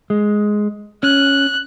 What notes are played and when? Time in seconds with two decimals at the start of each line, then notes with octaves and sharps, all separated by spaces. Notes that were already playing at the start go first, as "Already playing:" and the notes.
0.10 G#3
1.03 C#4 F#6